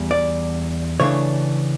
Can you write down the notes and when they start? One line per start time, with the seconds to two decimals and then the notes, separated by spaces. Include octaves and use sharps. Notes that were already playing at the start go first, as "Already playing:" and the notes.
Already playing: E2 G3
0.11 D5
1.00 C#3 E3 A3 D4 C#5